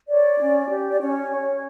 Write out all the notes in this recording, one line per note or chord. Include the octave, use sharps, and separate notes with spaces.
C#5 D5
C#4
G4
D5
C#4 C#5
C#5